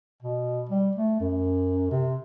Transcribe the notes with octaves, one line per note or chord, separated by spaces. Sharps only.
B2
G3
A3
F#2
C3